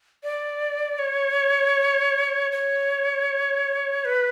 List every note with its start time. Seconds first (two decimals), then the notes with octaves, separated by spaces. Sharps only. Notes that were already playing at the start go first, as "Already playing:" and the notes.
0.23 D5
0.99 C#5
2.52 C#5
4.05 B4